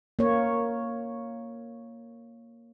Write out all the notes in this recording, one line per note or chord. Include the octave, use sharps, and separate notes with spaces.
A#3 C#5